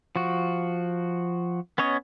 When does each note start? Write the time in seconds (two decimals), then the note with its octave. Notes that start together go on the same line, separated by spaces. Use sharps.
0.16 F3 F#4
1.78 B3 C#4 C#5 D#5